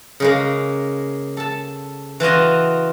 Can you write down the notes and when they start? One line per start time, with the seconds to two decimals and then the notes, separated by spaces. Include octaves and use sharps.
0.20 C#3 G#3 A#3
1.37 A4 A5
2.20 E3 F4 F#4 D#5